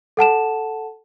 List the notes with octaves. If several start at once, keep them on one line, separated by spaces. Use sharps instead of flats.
A4 F#5 A5 E7